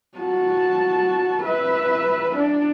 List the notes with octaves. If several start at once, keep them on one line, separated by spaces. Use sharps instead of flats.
F#4 A5
B4 E5
D4